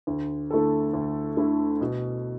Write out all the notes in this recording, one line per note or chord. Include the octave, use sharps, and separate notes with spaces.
D2
D3 A3 E4 A4
D2
D3 A3 E4 A4
B2